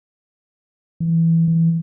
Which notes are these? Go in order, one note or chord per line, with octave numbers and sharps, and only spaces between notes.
E3
E3